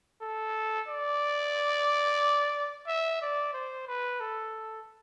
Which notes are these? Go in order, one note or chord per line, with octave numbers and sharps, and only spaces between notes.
A4
D5
E5
D5
C5
B4
A4